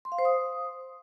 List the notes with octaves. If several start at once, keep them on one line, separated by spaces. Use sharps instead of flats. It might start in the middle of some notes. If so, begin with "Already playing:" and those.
C6
F5
C5
D#6